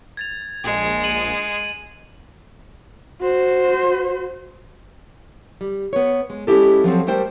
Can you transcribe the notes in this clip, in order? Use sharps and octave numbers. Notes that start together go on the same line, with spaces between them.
G#6 A6 F7
A#1 G#3
D#7 F#7
F#4 C5
G3
B3 C#5
G#3
G#3 C#4 D#4 E4 G4 A4
F3 F#3 C4 A4
G3 A3 G4 A#4 C5 G5